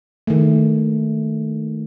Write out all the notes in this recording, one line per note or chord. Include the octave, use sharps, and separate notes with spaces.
D#3 A3